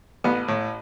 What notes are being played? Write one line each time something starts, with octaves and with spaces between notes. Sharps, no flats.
A1 B3
A2